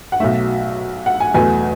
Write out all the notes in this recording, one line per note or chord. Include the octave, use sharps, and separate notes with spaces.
F#5
B1 B2 F#3 A3 E5
F#5
G#5
E2 B2 F#3 A3 G#5